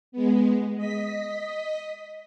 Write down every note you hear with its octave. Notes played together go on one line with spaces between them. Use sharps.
G#3 B3
D#5 B6